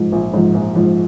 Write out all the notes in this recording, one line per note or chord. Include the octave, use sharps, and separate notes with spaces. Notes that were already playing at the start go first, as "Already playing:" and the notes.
Already playing: G#2 F3
A#1
G#2 F3
A#1
G#2 F3